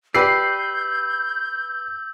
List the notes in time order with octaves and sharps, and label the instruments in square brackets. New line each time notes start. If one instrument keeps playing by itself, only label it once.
[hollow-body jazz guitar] G4 D5 [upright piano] B4 C7 [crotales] E6 [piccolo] G6